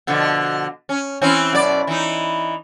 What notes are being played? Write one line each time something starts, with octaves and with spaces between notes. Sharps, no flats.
B2 D3 F3
C#4
E3 C4 C#4
F#2 B2 D5
E3 D#4